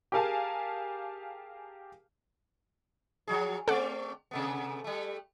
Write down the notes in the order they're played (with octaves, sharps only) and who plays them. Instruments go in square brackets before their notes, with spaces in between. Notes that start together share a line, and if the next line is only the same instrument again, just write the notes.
[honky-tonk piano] G4 G#4 A#4 F5 G#5 A5
[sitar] F3 F#3 G#4
[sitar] A3 C4 D5 [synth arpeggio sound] A4 F#5
[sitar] C3 A3 B3
G3 A3